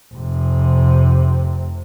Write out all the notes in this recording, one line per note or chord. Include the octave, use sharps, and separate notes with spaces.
F1 C3